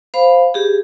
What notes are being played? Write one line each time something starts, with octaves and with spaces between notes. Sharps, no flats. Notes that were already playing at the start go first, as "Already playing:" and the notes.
C5 F5 B5
G4 G#4